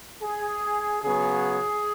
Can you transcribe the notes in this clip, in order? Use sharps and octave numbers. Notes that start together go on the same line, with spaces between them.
G#4
C#3 F#3 B3 G#4